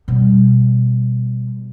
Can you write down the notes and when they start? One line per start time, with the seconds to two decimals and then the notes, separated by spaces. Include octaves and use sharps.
0.08 B2 G3